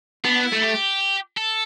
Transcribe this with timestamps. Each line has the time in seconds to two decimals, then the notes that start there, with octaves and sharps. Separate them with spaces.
0.25 B3 D4
0.44 E4
0.52 A3
0.63 G4
1.37 A4